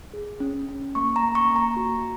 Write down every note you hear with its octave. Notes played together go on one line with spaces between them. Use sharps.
G#4
C#4
C#4
A#3 C#6
A#5
A#3
C#6
A#3
A#5
F#4